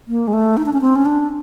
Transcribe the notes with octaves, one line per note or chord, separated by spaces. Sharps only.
A#3
G#3
A3
D#4
D4
C#4
C4
C#4
D4